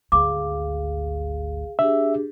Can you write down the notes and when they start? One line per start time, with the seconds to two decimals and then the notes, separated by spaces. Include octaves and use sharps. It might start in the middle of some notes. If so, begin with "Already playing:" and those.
0.12 G#1 D2 G#4 F5 D6
1.79 D4 G4 G#4 E5